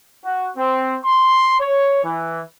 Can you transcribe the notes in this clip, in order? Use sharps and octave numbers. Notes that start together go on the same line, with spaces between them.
F#4
C4
C6
C#5
E3